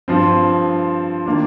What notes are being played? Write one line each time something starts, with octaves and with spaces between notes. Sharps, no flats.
G2 F3 C4
D#3 A#3 D4